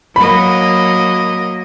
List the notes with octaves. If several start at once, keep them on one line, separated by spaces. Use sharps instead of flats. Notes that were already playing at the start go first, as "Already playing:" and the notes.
F#3 A#3 D#5 B5